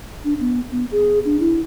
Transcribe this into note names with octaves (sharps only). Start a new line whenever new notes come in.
D4
B3
B3
G#4
D4
E4